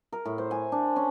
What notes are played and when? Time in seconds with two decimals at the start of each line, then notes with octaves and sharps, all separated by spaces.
0.12 A#4
0.25 A2
0.38 C5
0.51 G#5
0.72 D4
0.96 C#4